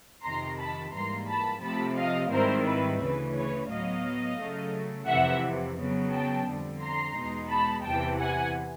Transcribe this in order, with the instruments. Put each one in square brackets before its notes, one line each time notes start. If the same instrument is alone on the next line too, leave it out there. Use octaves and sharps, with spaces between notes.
[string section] F2 C3 D#3 A#5 C6
A5 B5
G#2 E3 G3 A#3 A#5 C6
A5 B5
C3 F3 A3 C4 A5 B5
D#5 F5
G#2 D#3 G3 C4 E4 A#4 C5
B4
D2 C#3 E3 B4
B4 C#5
A2 F#3 B3 D#5 F5
C#3 F#3 A3
F2 C3 E3 E5 F#5
C#3 F#3 B3
G5 A5
F2 D3 G3
A#5 C6
E2 B2 G#3 B3 D#4
A5 B5
E2 C3 E3 G5 A5
F#5 G#5